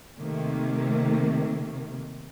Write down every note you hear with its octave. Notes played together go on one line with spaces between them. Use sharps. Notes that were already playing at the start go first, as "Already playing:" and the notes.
C3 D#3 A3 A#3